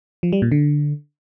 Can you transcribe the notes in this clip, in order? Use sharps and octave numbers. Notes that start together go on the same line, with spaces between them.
F3
G3
A#2
D3